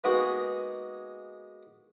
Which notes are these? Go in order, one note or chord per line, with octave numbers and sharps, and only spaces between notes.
G#3 A#3 B3 D#4 F#4 G#4